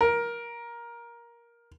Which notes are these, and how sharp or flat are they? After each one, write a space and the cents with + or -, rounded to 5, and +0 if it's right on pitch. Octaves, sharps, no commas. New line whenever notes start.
A#4 +15